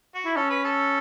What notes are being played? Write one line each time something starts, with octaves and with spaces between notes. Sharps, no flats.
F#4
E4
C#4 A4
B4
A4